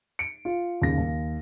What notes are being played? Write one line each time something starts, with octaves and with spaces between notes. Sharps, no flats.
C#7 D7
F4
D#2 C#3 A#6
D#2